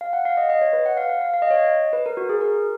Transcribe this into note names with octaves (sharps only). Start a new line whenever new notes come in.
F5
F#5
F5
D#5
D#5
C#5
B4
F#5
F5
F5
F5
F5
D#5
C#5
D#5
B4
A#4
F#4
G#4
A#4